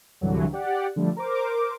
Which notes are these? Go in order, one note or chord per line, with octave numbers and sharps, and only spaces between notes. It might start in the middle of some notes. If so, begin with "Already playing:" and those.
C2 G2 D3 E3 F#3
G4 D5 F#5
D3 F3 G3 A3
A#4 C5 D6